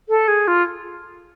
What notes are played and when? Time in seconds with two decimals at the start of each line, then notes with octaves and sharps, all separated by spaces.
0.09 A4
0.28 G#4
0.48 F4